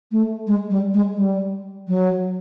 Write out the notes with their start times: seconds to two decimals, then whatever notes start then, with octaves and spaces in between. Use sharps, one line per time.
0.12 A3
0.47 G#3
0.70 G3
0.94 G#3
1.17 G3
1.88 F#3